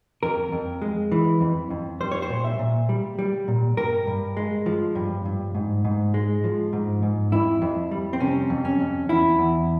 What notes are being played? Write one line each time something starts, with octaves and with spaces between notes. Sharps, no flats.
F2 A#4
F2
G#3
E3
F2
F2
G3 C5
C#5
C5
A#2
E5
A#2
G3
G3
A#2
G2 A#4
G2
G#3
F3
G2
G2
G#2
G#2
G#3
F3
G#2
G#2
F2 E4
F2
G3
C4
C3 C#4
F2
C#4
F2
E2 E4
E2